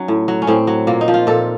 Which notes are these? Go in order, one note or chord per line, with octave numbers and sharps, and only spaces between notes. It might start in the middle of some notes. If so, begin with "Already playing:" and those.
Already playing: F#3 C#4 D#4
A2
F#3
C#4
A2 C4
F#3
A#2 A#3
D#4
F3
F4
A#2 A4